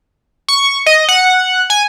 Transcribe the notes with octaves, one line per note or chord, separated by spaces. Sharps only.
C#6
D#5
F#5
G#5